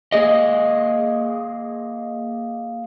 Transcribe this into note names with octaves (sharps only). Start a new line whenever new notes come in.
A#3 G#4 D#5